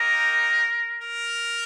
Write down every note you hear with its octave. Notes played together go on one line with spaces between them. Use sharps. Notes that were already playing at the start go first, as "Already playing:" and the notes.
Already playing: A#3 D#4 G4 A#4
A#4